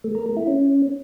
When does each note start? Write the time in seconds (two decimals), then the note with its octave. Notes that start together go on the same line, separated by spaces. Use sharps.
0.04 A3
0.15 A#4
0.26 A3
0.37 E4
0.47 C#4